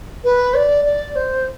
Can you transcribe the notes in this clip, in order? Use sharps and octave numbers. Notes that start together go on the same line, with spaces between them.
B4
D5
D5
C5